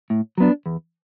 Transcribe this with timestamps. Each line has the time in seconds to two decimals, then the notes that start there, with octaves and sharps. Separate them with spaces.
0.10 A2
0.38 F#3 B3 D4
0.66 E2